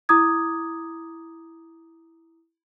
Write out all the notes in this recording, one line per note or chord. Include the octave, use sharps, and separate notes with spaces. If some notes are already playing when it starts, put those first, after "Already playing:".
E4 A#5 D6 D#6 G#6